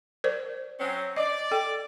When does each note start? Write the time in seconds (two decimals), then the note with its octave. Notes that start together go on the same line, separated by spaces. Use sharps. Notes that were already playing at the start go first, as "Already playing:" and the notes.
0.24 A#4 C5 D5
0.80 F#3 C4 C#4
1.16 D5 D#5
1.51 A4 G5